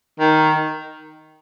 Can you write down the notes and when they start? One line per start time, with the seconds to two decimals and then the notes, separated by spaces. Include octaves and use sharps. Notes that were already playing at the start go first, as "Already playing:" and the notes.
0.20 D#3